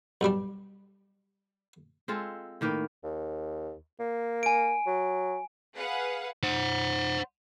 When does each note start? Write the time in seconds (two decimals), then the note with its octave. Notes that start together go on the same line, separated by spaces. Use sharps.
0.21 B1 G2 G3 D4
2.08 G#3 C4 F4 A4
2.61 A2 D#3 A#3 B4
3.04 D#2
4.00 A#3
4.43 G#5 D7
4.87 F#3
5.77 G#4 B4 F5 F#5
6.43 C5 F#5